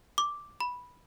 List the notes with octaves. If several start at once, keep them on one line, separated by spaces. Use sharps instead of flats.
D6
B5